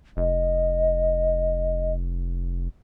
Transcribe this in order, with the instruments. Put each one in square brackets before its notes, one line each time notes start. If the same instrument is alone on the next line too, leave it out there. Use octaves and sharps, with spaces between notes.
[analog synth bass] F1 [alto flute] D#5